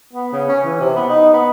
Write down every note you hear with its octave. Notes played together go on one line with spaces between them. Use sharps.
B3
C#3
C#4
E3
C3
B3
D#4
B3